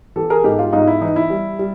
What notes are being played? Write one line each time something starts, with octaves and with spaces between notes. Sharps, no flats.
E3 G4 A4
G#4 A#4
G#2 G4 A4
F4 G4
G#2 D#4 F4
E4
E3 D#4
E4
G3
G3